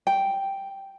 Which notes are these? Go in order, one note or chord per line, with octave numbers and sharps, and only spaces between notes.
G5